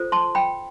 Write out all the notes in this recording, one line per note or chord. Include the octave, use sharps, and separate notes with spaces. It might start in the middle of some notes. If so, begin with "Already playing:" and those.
Already playing: F4 A4 C5
A5 C6
G5 B5